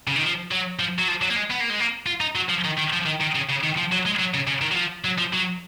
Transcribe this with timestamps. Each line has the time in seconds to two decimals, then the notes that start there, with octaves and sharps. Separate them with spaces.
0.07 C#3
0.16 D#3
0.23 F3
0.51 F#3
0.79 F3
0.99 F#3
1.08 F3
1.22 F#3
1.30 A#3
1.36 G#3
1.51 B3
1.61 A#3
1.70 G#3
1.80 A#3
2.06 F4
2.21 D#4
2.35 F#3
2.49 F3
2.64 D#3
2.77 D#3
2.92 F3
3.05 D#3
3.20 D#3
3.35 C#3
3.49 C#3
3.63 D#3
3.77 F3
3.92 F#3
4.05 G#3
4.19 F#3
4.34 C#3
4.47 C#3
4.62 D#3
4.72 F#3
4.75 F3
5.04 F#3
5.18 F3
5.33 F#3